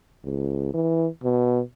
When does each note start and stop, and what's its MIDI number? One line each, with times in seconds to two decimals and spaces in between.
0.24 0.72 37
0.74 1.07 52
1.23 1.60 47